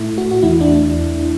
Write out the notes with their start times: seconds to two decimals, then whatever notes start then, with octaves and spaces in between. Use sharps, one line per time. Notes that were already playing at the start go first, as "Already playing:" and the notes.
Already playing: A2 A3 E4
0.18 F#4
0.31 F#4
0.43 E2 E3 A3 E4
0.61 D4